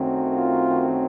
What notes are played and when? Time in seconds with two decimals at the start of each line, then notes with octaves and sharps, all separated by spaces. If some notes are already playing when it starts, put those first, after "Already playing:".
Already playing: F#2 D#3 F#3 A3 C4
0.35 F4